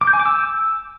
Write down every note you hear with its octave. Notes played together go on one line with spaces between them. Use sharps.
D6
G6
G#5
D6
E6